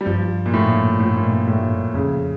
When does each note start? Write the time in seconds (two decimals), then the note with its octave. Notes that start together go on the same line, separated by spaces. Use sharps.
0.01 G3
0.06 G2 F3
0.46 A#2
0.54 A2
1.00 A2
1.14 A#2
1.28 A2
1.47 A2
1.94 F2 C#3